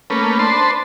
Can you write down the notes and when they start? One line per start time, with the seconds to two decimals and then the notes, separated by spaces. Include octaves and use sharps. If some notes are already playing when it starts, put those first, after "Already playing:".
0.10 A3 A#3 C#4 B4
0.39 D4 B4 C5 A5 C6